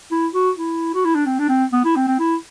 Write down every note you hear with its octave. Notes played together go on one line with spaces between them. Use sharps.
E4
F#4
E4
F#4
E4
D4
C4
D4
C4
B3
E4
C4
C4
E4